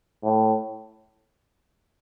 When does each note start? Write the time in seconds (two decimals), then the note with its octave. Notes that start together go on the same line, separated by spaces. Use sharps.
0.23 A2